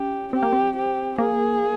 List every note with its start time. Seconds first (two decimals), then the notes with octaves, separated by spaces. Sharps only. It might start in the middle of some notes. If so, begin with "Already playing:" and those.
Already playing: C#4 G4
0.33 C4 G4
0.43 A#3
0.53 C4
0.76 G4
1.18 A#3 G#4